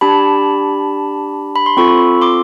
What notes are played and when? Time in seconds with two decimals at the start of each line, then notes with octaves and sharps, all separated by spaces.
0.01 D4 G4 A5 B5
1.56 B5
1.66 C6
1.77 C4 F4 A4 B5 C#6
2.21 C6 D6